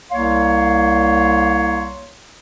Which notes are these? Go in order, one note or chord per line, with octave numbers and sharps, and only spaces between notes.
C2 A#3 C#5 F5 C6